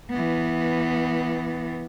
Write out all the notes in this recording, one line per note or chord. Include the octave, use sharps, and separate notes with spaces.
E3 B3